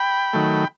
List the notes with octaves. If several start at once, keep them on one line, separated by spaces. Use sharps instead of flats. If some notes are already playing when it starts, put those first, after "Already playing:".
Already playing: G5 B5
D#3 F#3 A3